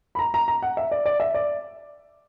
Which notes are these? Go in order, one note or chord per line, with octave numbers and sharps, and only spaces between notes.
B5
A#5
A#5
A#5
F#5
E5
D5
D5
E5
D5